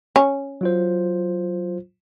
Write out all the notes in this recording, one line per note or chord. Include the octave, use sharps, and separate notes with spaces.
C#4
F#3 F4 C5